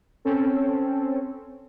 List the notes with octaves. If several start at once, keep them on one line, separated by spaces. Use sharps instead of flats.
C4 C#4 A4